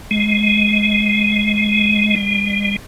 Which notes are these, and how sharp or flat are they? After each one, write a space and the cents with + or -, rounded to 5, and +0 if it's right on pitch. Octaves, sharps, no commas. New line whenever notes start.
G#3 +15
G#3 -45